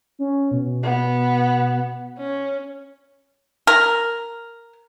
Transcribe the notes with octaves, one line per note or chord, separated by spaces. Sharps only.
C#4
B2
B3
C#4
A#4